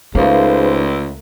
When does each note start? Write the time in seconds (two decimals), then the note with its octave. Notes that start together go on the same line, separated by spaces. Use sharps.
0.15 C#2 A3 A#3 D#4 G#4 B4 C5